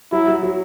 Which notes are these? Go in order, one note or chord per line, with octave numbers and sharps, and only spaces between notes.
F#3 E4
F#3
F#3